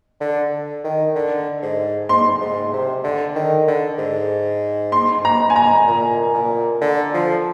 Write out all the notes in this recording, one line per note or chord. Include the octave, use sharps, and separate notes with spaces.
D3
D#3
D3
G#2
G#2 C6
G#2
C3
D3
D#3
D3
G#2
C6
A#5
G#5
A#5
A#2
A#2
D3
F3